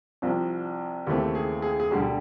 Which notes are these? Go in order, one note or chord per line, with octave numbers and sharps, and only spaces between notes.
C2 C3 F3
D#2 C#3 E3 A3 C4 G4
G#4
G#4
G#4
E1 D2 D3 G3 G4